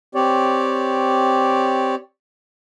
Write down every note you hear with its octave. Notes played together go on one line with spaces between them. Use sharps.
C4 G4 C#5 D5